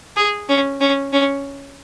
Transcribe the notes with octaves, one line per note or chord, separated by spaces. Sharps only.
G#4
C#4
C#4
C#4